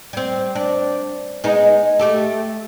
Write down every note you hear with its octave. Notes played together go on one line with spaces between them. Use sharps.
G3 C4
D4
G#3 B3 D#4
A3 G4 A4